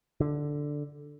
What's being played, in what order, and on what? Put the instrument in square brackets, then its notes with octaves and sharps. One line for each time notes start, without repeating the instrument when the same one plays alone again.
[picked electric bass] D3